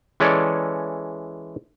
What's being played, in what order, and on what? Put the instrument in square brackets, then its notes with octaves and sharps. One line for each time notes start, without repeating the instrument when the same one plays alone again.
[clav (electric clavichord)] E3 G#3 C#4 A4 C#5 D5